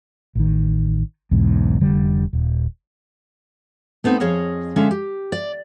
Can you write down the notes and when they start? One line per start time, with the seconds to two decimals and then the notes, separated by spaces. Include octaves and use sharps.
0.35 A1 D#3
1.31 B1 E2 G#2
1.81 F1 D3 G3
2.33 D#1
4.04 A3 B3 C4 D#4
4.20 F2 G#4 C#5 D#5 F5
4.76 D3 G#3 C#4 E5 F5
4.91 G4
5.32 D5